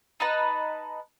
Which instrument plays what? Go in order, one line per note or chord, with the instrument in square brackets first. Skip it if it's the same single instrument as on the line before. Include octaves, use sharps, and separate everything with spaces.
[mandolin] D#4 B4 A5